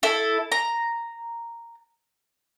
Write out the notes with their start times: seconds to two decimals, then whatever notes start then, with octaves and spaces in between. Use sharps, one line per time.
0.03 E4 A4
0.52 A#5